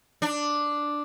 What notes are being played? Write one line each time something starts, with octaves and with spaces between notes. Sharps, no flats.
D4